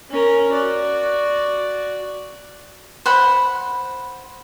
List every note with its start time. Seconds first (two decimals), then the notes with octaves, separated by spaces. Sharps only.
0.10 C#4 A#4
0.53 F#4 D5
3.06 C5 F#5 B5